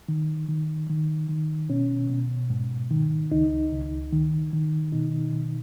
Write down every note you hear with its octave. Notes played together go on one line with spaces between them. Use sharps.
D#3
D#3
D#3
D#3
B2 C#4
B2
G#2
D#3
C#2 D#4
C#2
D#3
D#3
B2 D#4
B2